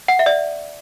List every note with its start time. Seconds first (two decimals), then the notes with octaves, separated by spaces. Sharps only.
0.08 F#5
0.19 E5
0.26 D5